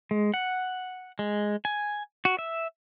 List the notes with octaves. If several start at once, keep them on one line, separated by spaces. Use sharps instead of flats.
G#3
F#5
G#3
G#5
F#4
E5